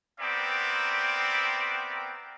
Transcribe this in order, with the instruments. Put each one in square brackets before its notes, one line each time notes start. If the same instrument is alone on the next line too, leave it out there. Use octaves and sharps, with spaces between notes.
[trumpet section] B3 C4 A#4 D5 E5 G5